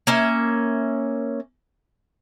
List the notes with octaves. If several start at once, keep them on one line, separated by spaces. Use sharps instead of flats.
A#3 C#4 E5